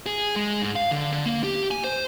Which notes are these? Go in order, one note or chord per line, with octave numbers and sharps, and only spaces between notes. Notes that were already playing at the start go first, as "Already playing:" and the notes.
G#4
G#3
G#2
F5
D3
D3
A#3
G4
G#5
C5